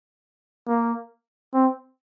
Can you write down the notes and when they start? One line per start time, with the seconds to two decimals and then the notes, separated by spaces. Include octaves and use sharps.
0.68 A#3
1.53 C4